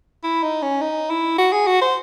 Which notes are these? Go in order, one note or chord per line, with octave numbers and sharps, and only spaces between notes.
E4
D#4
C#4
D#4
E4
F#4
G#4
F#4
C5